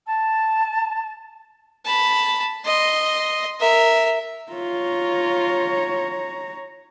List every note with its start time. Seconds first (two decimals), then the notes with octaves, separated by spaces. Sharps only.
0.07 A5
1.85 A5 B5
2.65 D#5 C6
3.60 A#4 E5
4.52 F4 C#5 A#5